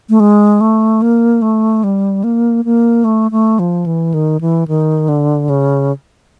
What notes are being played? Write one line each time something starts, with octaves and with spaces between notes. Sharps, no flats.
A3
G#3
A3
A#3
A3
G3
A#3
A#3
A3
A3
F3
E3
D#3
E3
D#3
D3
C#3